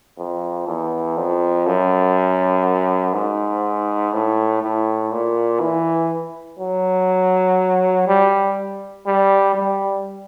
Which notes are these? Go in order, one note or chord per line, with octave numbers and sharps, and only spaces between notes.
F2
E2
F2
F#2
G#2
A2
A2
A#2
E3
F#3
G3
G3
G3